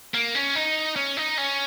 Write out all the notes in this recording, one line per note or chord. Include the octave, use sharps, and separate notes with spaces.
A#3
C#4
D#4
C#4
D#4
C#4